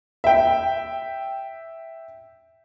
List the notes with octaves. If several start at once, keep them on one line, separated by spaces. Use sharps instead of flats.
E5 G5